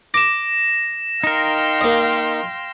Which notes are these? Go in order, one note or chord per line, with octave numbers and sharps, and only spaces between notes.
D6 A#6 E7
D#4 A#4 F5 G5 C6
A#3 D#5